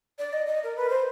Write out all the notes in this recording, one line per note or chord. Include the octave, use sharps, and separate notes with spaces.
D5
D#5
D#5
A#4
B4
C5